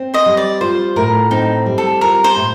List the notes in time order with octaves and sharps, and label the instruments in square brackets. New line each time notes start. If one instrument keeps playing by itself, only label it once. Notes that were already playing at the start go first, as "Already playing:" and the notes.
Already playing: [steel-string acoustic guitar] C4
[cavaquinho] C5 D#5
[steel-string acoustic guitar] G3
[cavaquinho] D5
[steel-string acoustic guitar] F4 [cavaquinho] C5
[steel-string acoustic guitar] A2 [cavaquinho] A#4
[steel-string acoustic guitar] C4 [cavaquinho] D#4
[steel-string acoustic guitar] G3
[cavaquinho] A4
[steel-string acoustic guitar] F4 [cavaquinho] A#4
[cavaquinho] C5
[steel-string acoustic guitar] A2